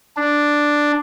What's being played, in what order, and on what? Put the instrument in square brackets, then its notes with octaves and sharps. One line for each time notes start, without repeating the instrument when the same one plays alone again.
[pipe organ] D4